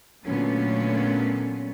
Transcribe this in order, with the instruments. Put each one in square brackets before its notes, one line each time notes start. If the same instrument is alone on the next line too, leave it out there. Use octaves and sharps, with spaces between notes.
[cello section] A#2 D3 F#3 A3 B3 C#4